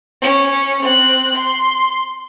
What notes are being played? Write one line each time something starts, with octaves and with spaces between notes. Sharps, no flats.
C#4
C4 F#6
C6